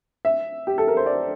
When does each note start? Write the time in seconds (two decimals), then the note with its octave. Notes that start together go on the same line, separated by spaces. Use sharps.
0.25 E5
0.67 G4
0.78 A4
0.88 A#4
0.97 C5
1.06 D5